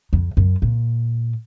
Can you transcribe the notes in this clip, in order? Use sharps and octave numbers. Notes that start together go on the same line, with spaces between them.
F2
F#2
A#2